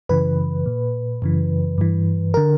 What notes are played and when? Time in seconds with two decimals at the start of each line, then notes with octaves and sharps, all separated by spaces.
0.09 F#2 C#3 E3 B4
0.66 A#2
1.22 F#2 C#3 E3
1.78 G2 E3
2.34 D3 A#4